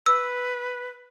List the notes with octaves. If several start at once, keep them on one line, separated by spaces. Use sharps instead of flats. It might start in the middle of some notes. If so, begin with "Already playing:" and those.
B4 E6